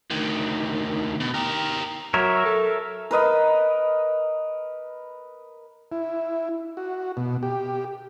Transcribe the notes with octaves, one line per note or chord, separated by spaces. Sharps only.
D2 D#3
B2
G4 A#4
F#3 A#4 C#5 E5
A4
A#4 B4 D#5 B5
E4
F#4
B2
G4